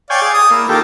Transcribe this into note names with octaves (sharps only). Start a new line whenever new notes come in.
C#5 D5 F5 G5 G#5
G#4
D#6
A#3 E4
D#3 A#3 F4 G4 A4